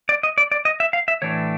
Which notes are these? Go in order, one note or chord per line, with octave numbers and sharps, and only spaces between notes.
D5
D#5
D5
D5
D#5
E5
F5
E5
A2 E3 A3 D4 C#5